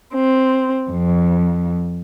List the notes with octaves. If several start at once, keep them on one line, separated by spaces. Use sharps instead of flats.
C4
F2